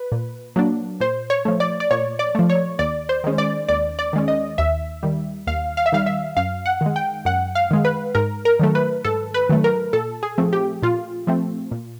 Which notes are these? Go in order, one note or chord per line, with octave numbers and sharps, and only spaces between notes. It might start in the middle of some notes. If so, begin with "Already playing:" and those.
Already playing: B4
A#2
F#3 A#3 D4
A#2 C5
C#5
F3 A3
D5
D5
A#2 C#5
D5
F3 A3
C#5
D#2 D5
C5
D#3 G#3 C#4
D5
D#2 D5
D5
D#3 G#3 C#4
D#5
D#2 E5
D#3 G3
D#2 F5
F5
E5
D#3 G3 F5
E5
F#2 F5
F#5
D#3 G#3
G5
F#2 F#5
F5
D#3 G#3
B4
G#2 A#4
A#4
D#3 F#3 A3
B4
G#2 A4
B4
D#3 F#3 A3
A#4
A#2 A4
G#4
F3 A3 C4
G4
A#2 F4
F3 A3 C4
A#2